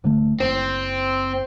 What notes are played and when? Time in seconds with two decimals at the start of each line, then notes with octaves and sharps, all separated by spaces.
0.04 D1 D3 A3
0.40 F#1 C4